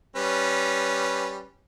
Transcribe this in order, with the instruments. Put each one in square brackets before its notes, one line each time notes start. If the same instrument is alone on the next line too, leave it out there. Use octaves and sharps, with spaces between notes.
[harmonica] G3 C#4 B4